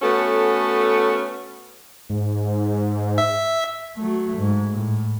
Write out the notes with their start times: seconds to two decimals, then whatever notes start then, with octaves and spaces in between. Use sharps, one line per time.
0.02 A3 B3 C#4 F#4 A4
2.10 G#2
3.18 E5
3.96 F#3 A3
4.36 G#2
4.72 A2